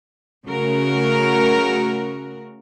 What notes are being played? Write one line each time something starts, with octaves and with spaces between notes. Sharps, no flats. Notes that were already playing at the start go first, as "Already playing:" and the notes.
C#3 A3 F#4 A#4